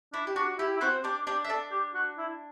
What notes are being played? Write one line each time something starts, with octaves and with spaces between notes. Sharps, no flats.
D4 E4
G4
D4 F#4
E4 G4
E4
C4 F#4 C5
D4 G4 D5
D4 G4 D5
E5
D4 A4 D5
G4
F#4
E4